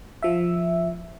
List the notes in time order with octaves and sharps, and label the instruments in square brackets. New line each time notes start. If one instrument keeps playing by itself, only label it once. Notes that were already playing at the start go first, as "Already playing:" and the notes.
[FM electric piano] F3 E5